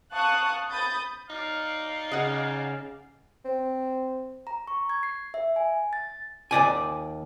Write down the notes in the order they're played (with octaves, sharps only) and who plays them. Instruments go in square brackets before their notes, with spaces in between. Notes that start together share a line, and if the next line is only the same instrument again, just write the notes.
[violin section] F5 A5 C#6 D#6 F#6
B5 D#6 G6 A6
[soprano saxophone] D#4 [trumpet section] D5 F5
[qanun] C#3 [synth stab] D#5 F#5
[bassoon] C4
[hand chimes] A#5
C#6
G#6
C7
E5
G#5
A6
[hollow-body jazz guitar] D#2 G#2 D5 G#5